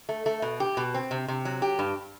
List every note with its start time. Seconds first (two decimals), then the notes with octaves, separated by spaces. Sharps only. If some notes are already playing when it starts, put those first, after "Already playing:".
0.09 A3
0.26 A3
0.42 B2
0.60 G4
0.77 B2
0.94 C4
1.11 C3
1.28 C3
1.45 F#3
1.62 G4
1.79 G2